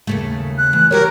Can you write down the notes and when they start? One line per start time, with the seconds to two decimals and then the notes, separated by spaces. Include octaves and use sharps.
0.07 D#2 C#3 A3
0.58 F#6
0.73 E3
0.91 F#4 G4 A#4 C#5